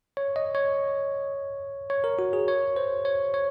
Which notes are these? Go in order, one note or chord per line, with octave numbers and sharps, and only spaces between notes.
C#5
D#5
C#5
C#5
A#4
F#4
G#4
C#5
C5
C#5
C#5